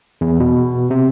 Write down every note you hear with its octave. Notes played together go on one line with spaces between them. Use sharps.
E2
B2
C3